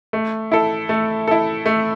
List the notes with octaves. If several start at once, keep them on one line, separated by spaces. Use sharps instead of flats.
A3
E4 A4
A3
E4 A4
A3